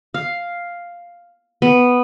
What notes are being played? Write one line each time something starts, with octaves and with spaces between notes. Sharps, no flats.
F5
B3